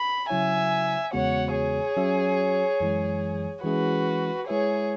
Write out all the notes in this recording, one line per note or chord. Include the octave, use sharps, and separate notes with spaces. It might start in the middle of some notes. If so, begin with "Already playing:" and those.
Already playing: B5
C#3 F#3 E4 C#5 E5 G#5
E2 C#3 G#3 B3 F#4 C#5 F#5
G#4 C#5
F#3 C#4 F#4 E5
F#2 E3 G#3
E3 G#3 C#4 E4 F#4 G#4 B4
G#3 E4 G#4 B4 C#5 E5